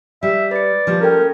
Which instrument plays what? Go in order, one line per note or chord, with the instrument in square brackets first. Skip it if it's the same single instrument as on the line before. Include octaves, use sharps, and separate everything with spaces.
[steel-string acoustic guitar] G3 [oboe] E5
[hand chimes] B4 C#7 [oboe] D5
[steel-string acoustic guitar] F3 G3 A#3
[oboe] C#4 [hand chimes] F4 A4 G5 [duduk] A#4